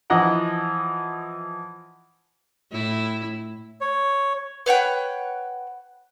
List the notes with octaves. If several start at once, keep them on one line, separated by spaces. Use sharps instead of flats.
E3 F3 D#5 F#5 A#5
A2 E4
C#5
B4 C#5 F#5 G5